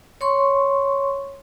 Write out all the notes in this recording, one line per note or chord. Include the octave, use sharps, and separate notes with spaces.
C#5 C6 C#6